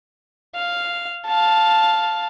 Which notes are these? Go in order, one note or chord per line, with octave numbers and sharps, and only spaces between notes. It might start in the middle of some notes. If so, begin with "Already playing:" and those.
F5
F5 A5